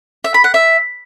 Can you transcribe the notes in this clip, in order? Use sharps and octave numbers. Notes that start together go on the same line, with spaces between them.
E5
B5
F#5
E5